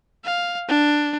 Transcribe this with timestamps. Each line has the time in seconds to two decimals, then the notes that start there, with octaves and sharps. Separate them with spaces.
0.25 F5
0.69 D4